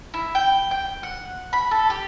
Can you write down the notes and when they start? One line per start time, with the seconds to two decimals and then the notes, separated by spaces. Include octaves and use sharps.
0.14 E4
0.35 G5
0.71 G5
1.03 F#5
1.53 B5
1.71 A4
1.90 G4